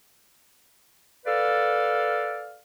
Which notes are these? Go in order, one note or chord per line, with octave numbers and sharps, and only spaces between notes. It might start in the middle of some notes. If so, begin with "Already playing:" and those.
A4 B4 D5 F5